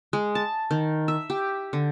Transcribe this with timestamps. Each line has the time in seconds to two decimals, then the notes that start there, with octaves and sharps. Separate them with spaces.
0.13 G#3
0.35 A5
0.71 D#3
1.08 E5
1.30 G4
1.73 D3